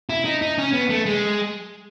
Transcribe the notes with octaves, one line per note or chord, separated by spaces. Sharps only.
E4
D#4
D#4
C#4
B3
A3
G#3